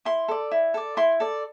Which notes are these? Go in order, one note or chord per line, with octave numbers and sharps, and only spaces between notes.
E4 C6
A4 D5
E4
A4 D5
E4 C6
A4 D5